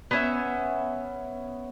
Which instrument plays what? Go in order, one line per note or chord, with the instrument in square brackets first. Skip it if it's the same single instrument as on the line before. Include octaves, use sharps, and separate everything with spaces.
[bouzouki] B3 C#4 E5